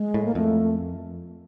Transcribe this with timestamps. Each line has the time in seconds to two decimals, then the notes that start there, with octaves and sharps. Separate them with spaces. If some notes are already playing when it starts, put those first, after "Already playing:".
Already playing: G#3
0.14 A2
0.25 A#3
0.35 F2 A3